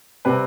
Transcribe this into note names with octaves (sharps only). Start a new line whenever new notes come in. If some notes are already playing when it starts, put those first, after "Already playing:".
C3 G3 C4 B4